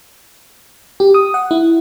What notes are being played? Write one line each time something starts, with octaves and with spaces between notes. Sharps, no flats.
G4
D#6
F#5
E4